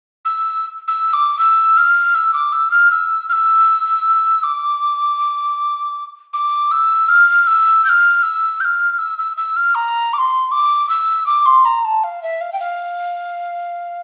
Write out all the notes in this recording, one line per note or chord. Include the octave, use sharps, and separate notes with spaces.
E6
E6
D6
E6
F6
E6
D6
E6
F6
E6
F6
E6
D6
D6
E6
F6
E6
G6
F6
E6
G6
F6
E6
E6
E6
F6
A#5
D6
C6
D6
E6
D6
C6
A#5
A5
F5
E5
F5
G5
F5